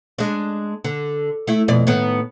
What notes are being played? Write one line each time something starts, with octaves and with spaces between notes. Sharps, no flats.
G#3 D4
D3
A3 E4
F2 B2 D5
A2 D#3 B3